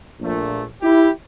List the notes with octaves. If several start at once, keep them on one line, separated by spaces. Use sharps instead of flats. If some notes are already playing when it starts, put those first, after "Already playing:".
A#1 A#2 A3
E4 G4